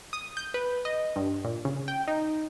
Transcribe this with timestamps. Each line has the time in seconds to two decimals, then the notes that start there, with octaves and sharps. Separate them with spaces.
0.13 D#6
0.37 G6
0.54 B4
0.85 D#5
1.16 G2
1.45 A#2
1.65 C#3
1.88 G5
2.08 D#4